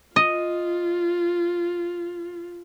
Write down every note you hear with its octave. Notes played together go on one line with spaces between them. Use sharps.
F4 D#5